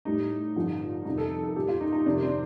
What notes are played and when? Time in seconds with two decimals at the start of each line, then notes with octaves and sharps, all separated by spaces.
0.05 A2 G3 D#4
0.56 G2 D3 F3
1.05 F2 C3 D#3 G3 D#4
1.18 A4
1.44 A4
1.56 A#2 G3 G4
1.68 F4
1.81 D#4
1.93 D#4
2.05 F2 C3 D#3 G3 D4
2.23 C4